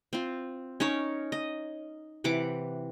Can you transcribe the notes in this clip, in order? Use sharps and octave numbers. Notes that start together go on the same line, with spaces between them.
C4 F4
C#4 D#4 A#4 C#5
D#5
C3 E3 F#5 D6